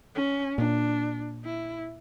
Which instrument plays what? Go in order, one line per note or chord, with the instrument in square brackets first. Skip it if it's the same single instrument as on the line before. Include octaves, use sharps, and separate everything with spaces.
[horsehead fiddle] C#4
[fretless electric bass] A#2 [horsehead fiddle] D4
[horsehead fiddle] E4